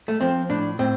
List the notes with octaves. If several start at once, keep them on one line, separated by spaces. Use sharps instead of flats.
A3
F3 C4
A2 D4
A2 C4